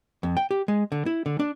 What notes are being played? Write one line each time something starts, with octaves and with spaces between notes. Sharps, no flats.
F2
G5
G4
G#3
D3
E4
D3
D4